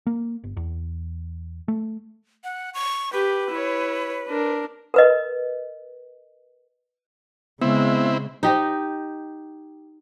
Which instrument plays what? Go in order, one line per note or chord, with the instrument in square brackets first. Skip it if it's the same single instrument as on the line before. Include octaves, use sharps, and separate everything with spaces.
[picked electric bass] A#3
G1
E2
A3
[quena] F#5
C#6
[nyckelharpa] G4 [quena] B4
[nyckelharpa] E4 C#5
D4 A#4
[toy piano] A#4 B4 D#5
[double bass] C#3 [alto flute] G#3 [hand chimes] B3 [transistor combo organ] C4 E4
[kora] D#4 G4 D#5